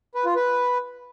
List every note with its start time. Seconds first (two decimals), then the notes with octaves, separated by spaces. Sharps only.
0.15 B4
0.25 F4
0.36 B4